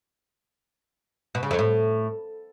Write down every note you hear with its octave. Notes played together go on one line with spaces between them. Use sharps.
B2
C#3
F2
A2